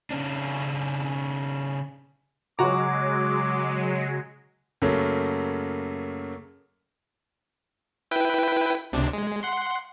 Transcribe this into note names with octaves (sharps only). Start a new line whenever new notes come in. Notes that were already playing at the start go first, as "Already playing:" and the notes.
C#3 C#4 D4
C#3 F#3 G#3 F#4 A#5 D6
F#2 C#3 F#3 A3 A#3
E4 B4 G5
C#2 C3 D4
G#3
F#5 C6